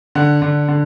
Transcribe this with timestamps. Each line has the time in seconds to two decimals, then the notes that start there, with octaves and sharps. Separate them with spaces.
0.15 D3 F#5
0.42 D3
0.68 D3